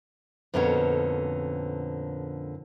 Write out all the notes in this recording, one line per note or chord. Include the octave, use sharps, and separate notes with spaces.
F2 A#2 D3 B3 C#4 F#4